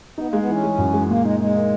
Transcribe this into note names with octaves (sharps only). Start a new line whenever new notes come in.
B3 D#4
G#3 A#3
B3
E3 C#4
G#3
F#2
G#3
A#2 A#3
G#3 D#4
G#3 D#4
A#3